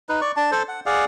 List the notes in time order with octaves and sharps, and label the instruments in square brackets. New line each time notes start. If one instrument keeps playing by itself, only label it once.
[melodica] D#4 B4
D5 C#6
D4 A5
A4 C5
F#5
G#4 D5 F5 F#5